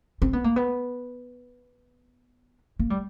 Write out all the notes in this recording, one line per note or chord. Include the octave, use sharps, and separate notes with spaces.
C4
B3
A#3
B3
A#3
G3